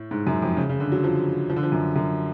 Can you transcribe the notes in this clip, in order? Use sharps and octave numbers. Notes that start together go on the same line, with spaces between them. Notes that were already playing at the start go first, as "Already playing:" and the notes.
Already playing: A2
G#2
F#2
F2
C#3
C#3
D3
F#3
F3
F3
D3
F3
F#2
F#2